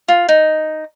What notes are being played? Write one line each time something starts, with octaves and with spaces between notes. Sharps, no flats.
F4
D#4